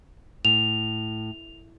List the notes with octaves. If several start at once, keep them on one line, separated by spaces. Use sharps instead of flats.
A2 F7